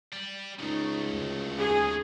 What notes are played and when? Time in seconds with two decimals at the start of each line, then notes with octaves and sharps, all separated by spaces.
0.13 G3
0.59 C#2 C#3 A3 D#4
1.07 D2
1.60 D#2 G#4